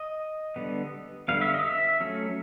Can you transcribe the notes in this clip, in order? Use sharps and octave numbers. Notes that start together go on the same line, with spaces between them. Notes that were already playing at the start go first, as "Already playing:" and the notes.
Already playing: D#5
D3 G3 B3
D3 G3 B3 F5
E5
D#5
E5
F#3 A3 C#4